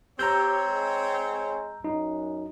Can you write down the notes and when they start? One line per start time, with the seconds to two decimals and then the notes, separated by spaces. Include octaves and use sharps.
0.19 C4 G4 C#5 A#5 E6 G6
0.68 G#3
1.84 F#2 D#4